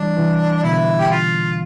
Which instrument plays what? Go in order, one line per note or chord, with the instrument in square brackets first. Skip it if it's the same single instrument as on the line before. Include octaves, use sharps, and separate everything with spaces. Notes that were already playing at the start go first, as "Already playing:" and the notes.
Already playing: [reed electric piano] E3 G3 [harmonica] D4
[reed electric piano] C3 E3
[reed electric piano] B2 D3 [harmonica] E4
[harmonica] G4
F4